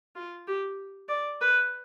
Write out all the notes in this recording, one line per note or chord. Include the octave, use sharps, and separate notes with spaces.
F4
G4
D5
B4